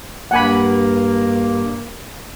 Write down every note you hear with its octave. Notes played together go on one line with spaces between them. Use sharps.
G2 A#3 F#5 G#5 B5